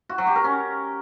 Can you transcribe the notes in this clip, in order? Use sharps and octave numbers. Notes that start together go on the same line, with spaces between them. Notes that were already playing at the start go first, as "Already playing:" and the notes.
F#4
F#3
G4
A#4
C#4